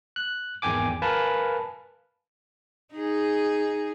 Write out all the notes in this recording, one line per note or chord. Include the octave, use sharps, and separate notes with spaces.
F#6
G#1 E2 D#3 G5 G#5 D6
A#4 B4 F5 G#5 A5 B5
D#4 G#4